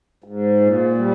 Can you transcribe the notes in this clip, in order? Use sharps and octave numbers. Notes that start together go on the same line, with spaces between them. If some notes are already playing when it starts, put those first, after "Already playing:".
G#2
A#2
G3